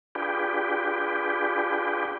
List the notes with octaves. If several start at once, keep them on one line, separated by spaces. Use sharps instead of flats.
D4 F4 G4 G#4 B4 G5